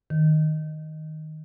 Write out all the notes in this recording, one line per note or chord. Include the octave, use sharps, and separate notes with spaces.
D#3